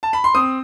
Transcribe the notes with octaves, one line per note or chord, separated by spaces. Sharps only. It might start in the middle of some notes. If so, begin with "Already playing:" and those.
A5
B5
C6
C4 D#6